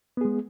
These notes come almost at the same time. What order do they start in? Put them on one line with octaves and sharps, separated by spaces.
B3 G#4 G#3